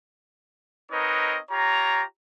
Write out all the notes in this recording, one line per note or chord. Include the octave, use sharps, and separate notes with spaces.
C4 D#4 A#4 B4 C#5 D#5
F4 G4 C#5 A#5